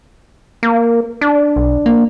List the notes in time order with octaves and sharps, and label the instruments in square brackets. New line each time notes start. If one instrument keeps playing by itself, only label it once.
[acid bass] A#3
D4
[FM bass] B1
A#3